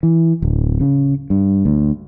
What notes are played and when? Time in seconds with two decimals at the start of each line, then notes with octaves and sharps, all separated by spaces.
0.03 E3
0.42 D1
0.80 C#3
1.30 G2
1.65 D2